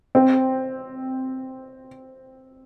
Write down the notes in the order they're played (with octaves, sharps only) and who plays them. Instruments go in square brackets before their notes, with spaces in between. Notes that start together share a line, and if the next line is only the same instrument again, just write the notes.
[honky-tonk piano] C4